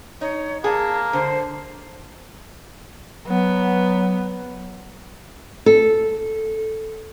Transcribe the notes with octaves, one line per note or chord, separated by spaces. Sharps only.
D#4 C#5
A#3 G#4 A5
D3 C5
F#3 B3
A4